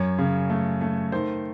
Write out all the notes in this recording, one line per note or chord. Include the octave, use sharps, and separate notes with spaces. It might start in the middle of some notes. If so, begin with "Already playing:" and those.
Already playing: F#2 C#5
C#3
A3
A3
D#3 C5